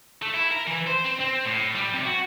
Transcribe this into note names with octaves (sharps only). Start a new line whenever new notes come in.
A3
E4
A#4
E3
C5
C4
C4
A2
G3
C3
F#4